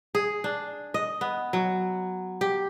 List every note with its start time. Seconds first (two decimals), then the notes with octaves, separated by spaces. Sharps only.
0.15 G#4
0.44 D4
0.94 D#5
1.21 B3
1.53 F#3
2.41 G4